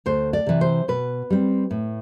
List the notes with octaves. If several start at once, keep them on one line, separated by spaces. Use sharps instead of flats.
D2 C5
D5
C3 E3
C5
B2 B4
G3 C4
A2